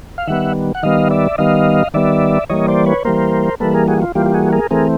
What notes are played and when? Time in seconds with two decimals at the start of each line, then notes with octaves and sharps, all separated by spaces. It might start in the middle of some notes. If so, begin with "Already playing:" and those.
0.18 F5
0.28 D#3 G3 B3 E5 F#5
0.75 F#5
0.83 D#3 G3 B3 D#5 F5
1.11 D5 E5
1.38 D#3 G3 B3 D#5 F5
1.94 D#3 G3 B3 D5 E5
2.49 E3 G3 A#3 C#5 D#5
2.68 C5 D5
2.86 B4 C#5
3.05 E3 G3 A#3 A#4 C5
3.60 E3 G3 A#3 A4 B4
3.74 G#4 A#4
3.88 F#4 G#4
3.98 F#4
4.02 F4
4.15 E3 G3 A#3 F4 G4
4.26 G4
4.34 F#4 G#4
4.53 G#4 A#4
4.71 E3 A3 C4 G#4 A#4